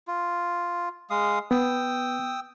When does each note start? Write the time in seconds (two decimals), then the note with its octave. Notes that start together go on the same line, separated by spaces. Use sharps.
0.08 F4
1.10 G#3 F5 D#6
1.51 B3 G5 D#6 E6